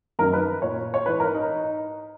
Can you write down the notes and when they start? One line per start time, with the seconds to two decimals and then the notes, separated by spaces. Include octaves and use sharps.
0.19 F#2 D#3 A#4
0.33 B4
0.62 A#2 C#5
0.94 C#5
1.06 G#2 E3 B4
1.20 A#4
1.35 D#4